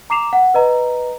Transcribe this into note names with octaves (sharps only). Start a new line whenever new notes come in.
A#5 D6 C7 E7 F7
F#5
B4 D#5 A#5